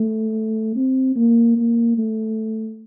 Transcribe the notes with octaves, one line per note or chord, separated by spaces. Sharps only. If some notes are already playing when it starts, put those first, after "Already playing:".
Already playing: A3
C4
A#3
A#3
A3